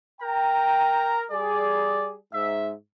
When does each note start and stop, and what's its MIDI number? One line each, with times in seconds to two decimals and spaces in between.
0.21 1.25 70
0.21 1.15 79
0.21 1.25 82
1.31 2.16 55
1.31 2.16 68
1.31 2.12 74
2.33 2.72 44
2.33 2.72 76